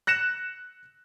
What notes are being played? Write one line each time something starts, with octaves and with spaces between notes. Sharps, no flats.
F#6 A#6 C#7 E7